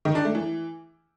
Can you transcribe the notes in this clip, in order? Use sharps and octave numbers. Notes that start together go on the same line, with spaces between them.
D#3
D4
A3
E3